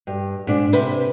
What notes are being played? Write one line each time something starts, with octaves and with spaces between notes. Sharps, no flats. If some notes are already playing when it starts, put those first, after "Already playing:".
G2
G#2 D4
C3 E4 B4 C5